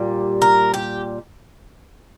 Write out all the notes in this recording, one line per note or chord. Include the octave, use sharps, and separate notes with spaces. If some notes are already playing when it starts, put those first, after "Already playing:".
Already playing: A#2 G3
A#4
G4